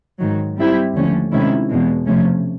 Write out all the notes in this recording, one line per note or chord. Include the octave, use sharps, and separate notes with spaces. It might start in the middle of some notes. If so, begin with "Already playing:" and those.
G#2 D#3 F#3
G3 C4 E4 G4
D#2 D3 F3 A3 C#4
C3 D#3 G#3 C#4 E4
E2 B2 G#3
C3 F3 A3 C#4